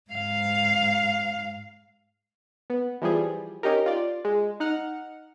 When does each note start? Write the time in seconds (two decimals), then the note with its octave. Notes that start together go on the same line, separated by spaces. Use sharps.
0.11 G#2 F5
2.70 B3
3.02 E3 F3 G3 G#4
3.63 C#4 D#4 G4 A#4
3.86 F4 D5
4.25 G#3
4.60 D#4 F#5 F6